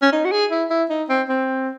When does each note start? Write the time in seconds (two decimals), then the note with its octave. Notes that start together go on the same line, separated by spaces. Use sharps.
0.02 C#4
0.12 D#4
0.25 F#4
0.32 G#4
0.51 E4
0.70 E4
0.90 D#4
1.09 C4
1.29 C4